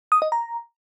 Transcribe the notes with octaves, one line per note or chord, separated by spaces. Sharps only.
D#6
D#5
A#5